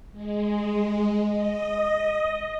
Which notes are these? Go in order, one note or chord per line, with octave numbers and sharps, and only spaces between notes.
G#3
D#5